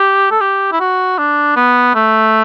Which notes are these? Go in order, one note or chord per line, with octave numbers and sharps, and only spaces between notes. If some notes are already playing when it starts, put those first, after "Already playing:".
Already playing: G4
A4
G4
E4
F#4
D4
B3
A3